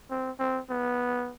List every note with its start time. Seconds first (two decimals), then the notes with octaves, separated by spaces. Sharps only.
0.10 C4
0.39 C4
0.70 B3